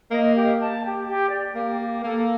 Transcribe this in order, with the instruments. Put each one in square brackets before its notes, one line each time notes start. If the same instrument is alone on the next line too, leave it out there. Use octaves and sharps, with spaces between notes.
[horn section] A#3 [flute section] D#5
[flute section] G4
A5
G4
G4
D5
[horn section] A#3 [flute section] G4
[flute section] G4
[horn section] A#3 [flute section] A4